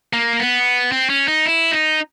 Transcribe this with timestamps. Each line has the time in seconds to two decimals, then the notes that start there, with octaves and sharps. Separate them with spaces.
0.13 A#3
0.40 B3
0.92 C4
1.10 C#4
1.28 D#4
1.46 E4
1.72 D#4